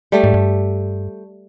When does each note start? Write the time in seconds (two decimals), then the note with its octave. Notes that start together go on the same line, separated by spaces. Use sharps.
0.12 G3 A3
0.24 G#2
0.34 G2